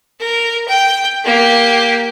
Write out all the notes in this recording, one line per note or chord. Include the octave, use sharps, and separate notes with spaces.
A#4
G5
A#3 G4